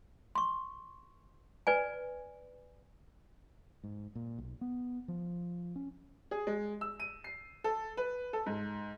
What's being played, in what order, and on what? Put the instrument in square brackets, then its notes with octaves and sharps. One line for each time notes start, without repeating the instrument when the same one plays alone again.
[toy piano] C6 C#6
B4 D5 G#5
[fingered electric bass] G#2
A#2
B1
B3
F3
C#4
[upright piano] G#4
G#3
E6
D#7
C7
A4
B4
A4
G#2